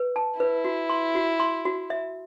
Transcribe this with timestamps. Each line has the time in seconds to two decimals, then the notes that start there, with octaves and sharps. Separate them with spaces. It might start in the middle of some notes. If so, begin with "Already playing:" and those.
Already playing: B4
0.16 A5
0.40 E4 B4
0.65 F#4
0.89 C6
1.15 F#4
1.40 C6
1.65 F#4
1.90 E5